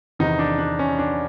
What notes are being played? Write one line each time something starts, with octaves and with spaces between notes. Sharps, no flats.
E2 C3 D#3 D#4
D4
D4
C#4
D4